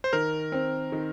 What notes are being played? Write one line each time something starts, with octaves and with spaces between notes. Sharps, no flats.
C5
D#3 A#4
C4
D#3